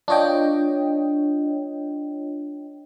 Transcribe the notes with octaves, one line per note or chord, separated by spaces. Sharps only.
D4 F4 C#5 D#5 G5